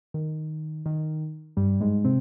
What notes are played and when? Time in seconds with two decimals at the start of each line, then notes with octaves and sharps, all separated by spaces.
0.14 D#3
0.86 D#3
1.57 G2 G3
1.80 G#2 G#3
2.04 C3 C4